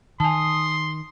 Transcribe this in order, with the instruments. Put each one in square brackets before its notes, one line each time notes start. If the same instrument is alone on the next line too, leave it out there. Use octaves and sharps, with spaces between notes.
[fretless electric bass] D#3 [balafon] G#5 A5 [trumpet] C6 [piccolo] D#6